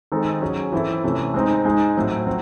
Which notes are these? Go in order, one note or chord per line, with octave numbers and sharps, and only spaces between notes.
D#3 G#3 C4 D#4 A4
F#3 C#4 G#4
E3 C4 E4 A4
C3 E3 A3 C#4
G#3 C4 D#4
G#3 D#4 G#4
A2 F#3 C4
F#3 C4 F#4